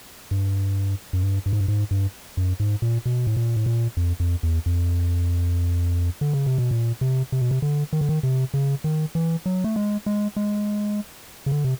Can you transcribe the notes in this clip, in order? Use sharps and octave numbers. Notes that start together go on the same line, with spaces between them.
G2
F#2
G2
G2
G#2
G2
G#2
G2
F#2
G#2
A#2
B2
A2
A#2
A2
A#2
F2
F2
E2
F2
D3
C#3
C3
B2
A#2
C3
C3
B2
C3
D3
D#3
D3
D#3
C3
C#3
D#3
E3
F#3
A3
G#3
G#3
G#3
C#3
D3
C3